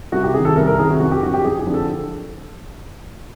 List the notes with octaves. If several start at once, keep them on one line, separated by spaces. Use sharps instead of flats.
C2 F#4
G4
C3 D#3 G#4
A4
C2 A#4
A#4
C3 D#3 G#4
F#4
F2 F#4
G4
D3 F3 F#4
G4
F2 G#4
G#4
D3 F3
A4